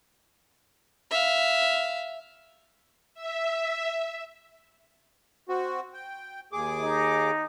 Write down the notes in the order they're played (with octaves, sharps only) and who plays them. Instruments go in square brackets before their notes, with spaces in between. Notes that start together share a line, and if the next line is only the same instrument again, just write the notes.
[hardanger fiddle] E5 F5
[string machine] E5
[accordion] C4 F#4
G5
D#2 G#4 D6
[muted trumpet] D#4